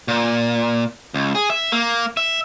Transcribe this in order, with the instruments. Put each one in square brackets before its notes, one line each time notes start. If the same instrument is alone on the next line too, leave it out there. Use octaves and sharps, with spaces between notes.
[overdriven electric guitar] A#2
C#2
G#4
E5
A#3
E5